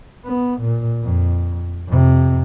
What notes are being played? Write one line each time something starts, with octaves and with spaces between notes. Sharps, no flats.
B3
A#2
F2
F2 C3